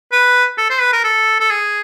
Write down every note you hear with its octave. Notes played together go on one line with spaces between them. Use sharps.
B4
A4
C5
B4
A#4
A4
A4
G#4